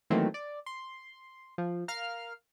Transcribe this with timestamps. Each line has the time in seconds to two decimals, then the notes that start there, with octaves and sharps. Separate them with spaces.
0.10 D#3 E3 F#3 A3 A#3 C4
0.34 D5
0.66 C6
1.58 F3
1.88 A#4 F5 F6